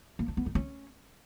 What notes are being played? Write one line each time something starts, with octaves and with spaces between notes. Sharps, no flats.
A#3
D4
B3
D#4
C#4